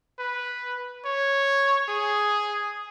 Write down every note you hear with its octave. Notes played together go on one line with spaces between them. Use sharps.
B4
C#5
G#4